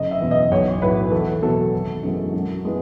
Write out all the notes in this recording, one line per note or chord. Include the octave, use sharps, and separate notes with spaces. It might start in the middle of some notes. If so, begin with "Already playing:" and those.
Already playing: F#1 D#5
E5
E2 B2
D#5
B1 C#5
A2 F#3 B3 B4
E2 A4
B2 F#3 A3 A4
G#1
F#2 E3 G#3
F#2
E3 G#3 B3